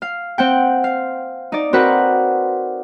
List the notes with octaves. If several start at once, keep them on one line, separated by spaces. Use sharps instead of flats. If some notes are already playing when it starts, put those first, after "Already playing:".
F5
C4 F#5 G5
F5
D#4 D5
C4 F#4 A#4 B4 F#5